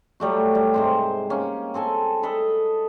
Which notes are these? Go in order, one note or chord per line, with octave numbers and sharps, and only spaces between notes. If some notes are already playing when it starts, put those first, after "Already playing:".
F#3 G3 A3 F#4
G3
G#2 C3 C5
A#3 C#4
C4 A4 G#5 A5
A4 B4 D#5